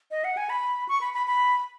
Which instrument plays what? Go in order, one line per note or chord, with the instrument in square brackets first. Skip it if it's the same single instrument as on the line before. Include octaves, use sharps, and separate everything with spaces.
[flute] D#5
F#5
G#5
B5
C#6
B5
B5
B5